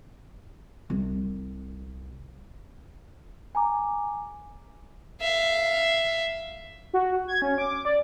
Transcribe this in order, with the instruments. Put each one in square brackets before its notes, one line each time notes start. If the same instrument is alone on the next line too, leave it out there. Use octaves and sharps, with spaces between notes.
[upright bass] C2 C4
[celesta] G#5 A#5 D6
[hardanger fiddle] E5 F5
[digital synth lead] F#4
G#6
C#4
D6
D5